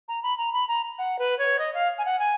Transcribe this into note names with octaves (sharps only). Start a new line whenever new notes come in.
A#5
B5
A#5
B5
A#5
F#5
B4
C#5
D#5
F5
G#5
F#5
G#5